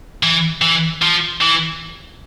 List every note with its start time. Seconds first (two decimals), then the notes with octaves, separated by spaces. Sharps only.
0.23 E3
0.62 E3
1.02 F3
1.41 E3